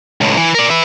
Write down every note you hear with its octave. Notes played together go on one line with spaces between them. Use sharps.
C#2 A2
E3
A#4 D5
B4 E5